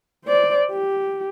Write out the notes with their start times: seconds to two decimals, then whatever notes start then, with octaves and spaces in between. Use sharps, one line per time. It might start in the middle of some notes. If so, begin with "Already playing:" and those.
0.25 C5 D5
0.71 G4